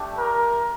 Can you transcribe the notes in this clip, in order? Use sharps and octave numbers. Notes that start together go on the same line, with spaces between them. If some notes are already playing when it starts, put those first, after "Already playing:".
Already playing: A3 D4 G4
A#4